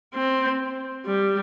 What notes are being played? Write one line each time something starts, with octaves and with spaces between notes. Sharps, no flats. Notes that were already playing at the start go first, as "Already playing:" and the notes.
C4
G3